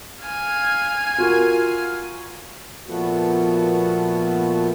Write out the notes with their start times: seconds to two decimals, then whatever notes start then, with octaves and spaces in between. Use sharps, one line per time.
0.23 F5 G#5
1.18 F4 F#4 A#4
2.86 A#2 F3 A3 B3 F#4